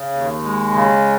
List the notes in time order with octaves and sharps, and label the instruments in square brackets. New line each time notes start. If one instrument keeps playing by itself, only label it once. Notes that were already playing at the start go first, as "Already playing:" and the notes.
Already playing: [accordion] C#3
D#2
G#3
C#3